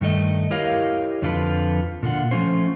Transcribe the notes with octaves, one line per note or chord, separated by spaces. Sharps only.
G2 D#3 A3 D#5
E4 G4 A#4 C#5 D#5 F5
F2 D3 F3 F4 A4 B4
A#2 D3 F4 F#5
F3 A3 C#4 F4 C5